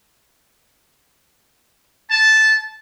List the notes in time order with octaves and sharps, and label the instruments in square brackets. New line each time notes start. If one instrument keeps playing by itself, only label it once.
[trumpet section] A5